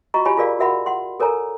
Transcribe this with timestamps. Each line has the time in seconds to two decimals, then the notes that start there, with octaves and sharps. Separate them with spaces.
0.14 F4 F#4 D#5 A#5 C#6
0.25 F4 G4 C#5 G#5 B5
0.37 F4 G#4 A#4 D5 F5
0.59 F#4 A#4 E5 F#5 B5
0.86 F#5 C6
1.20 A4 A#4 C#5 G#5 A#5